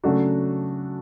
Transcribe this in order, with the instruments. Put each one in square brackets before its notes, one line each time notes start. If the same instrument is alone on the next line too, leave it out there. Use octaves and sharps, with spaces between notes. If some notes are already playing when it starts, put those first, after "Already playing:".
[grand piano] C#3 F#3 A3 D4 F#4